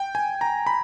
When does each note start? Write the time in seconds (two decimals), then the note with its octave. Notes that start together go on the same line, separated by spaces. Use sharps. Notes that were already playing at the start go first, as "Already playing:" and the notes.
Already playing: G5
0.15 G#5
0.41 A#5
0.67 B5